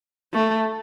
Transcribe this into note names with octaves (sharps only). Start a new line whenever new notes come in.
A3